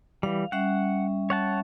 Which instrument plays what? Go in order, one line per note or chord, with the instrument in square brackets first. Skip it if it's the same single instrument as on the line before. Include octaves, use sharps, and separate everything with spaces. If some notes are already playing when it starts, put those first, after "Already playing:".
[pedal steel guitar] E3 G3 [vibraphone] F5
[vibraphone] G3 C#4 E5 [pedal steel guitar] F#5
[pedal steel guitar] C#5 F#5 A5